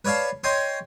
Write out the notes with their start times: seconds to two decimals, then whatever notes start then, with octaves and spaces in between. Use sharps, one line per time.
0.05 B4 C#5 D5 F5 A5
0.44 C#5 D#5 G5 G#5 C6